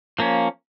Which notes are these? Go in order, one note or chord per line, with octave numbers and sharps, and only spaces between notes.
F3 A#3 C#4